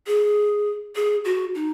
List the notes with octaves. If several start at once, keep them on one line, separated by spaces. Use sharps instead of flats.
G#4
G#4
F#4
D#4